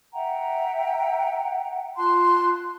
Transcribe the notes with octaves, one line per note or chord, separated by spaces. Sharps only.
E5 F#5 G5 A#5
F4 A5 C6 F#6